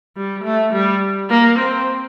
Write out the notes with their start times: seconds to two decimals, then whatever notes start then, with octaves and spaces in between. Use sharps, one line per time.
0.17 G3
0.44 A3
0.73 G3
1.30 A#3
1.59 C4